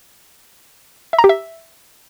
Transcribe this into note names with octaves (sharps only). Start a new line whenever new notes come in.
E5
A#5
G4
E5